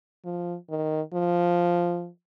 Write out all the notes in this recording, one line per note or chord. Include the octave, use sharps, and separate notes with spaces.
F3
D#3
F3